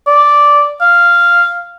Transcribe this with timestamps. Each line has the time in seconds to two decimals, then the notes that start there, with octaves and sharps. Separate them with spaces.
0.07 D5
0.81 F5